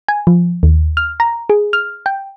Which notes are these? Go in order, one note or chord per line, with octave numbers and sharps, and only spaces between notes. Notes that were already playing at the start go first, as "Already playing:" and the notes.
G#5
F3
D#2
F6
A#5
G#4
F6
G5